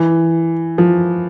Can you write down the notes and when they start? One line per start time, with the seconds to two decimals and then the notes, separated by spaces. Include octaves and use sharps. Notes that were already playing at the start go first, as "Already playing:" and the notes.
Already playing: E3
0.78 F3